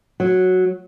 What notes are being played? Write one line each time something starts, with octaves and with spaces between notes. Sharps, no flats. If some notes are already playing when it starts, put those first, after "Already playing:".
F#3